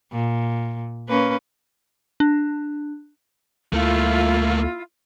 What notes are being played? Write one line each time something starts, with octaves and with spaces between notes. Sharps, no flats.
A#2
A#3 C#4 B4
D4
D2 A3 A#3 E4 F4